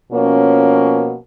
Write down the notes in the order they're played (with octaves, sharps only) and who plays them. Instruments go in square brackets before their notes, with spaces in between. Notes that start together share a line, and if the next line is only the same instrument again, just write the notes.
[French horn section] B2 F3 A#3 C#4